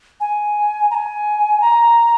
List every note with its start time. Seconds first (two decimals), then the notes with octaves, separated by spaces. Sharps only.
0.20 G#5
0.91 A#5
0.95 G#5
1.61 A#5